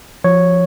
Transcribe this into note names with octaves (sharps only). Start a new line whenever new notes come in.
F3 C#5